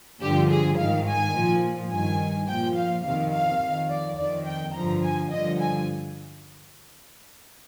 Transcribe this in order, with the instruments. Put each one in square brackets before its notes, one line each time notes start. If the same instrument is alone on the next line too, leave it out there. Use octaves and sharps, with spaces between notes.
[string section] G2 D3 F3 G4
G#4
G#2 D#3 F5
G#5
A#2 F3
G2 D#3 G#5
A#2 F3 G5
F5
F2 C3 D#3 F5
F5
F2 D#3
D5
F2 D#3 D5
G5
G2 D3 F3 A#5
G#5
G2 D3 F3 D#5
G#5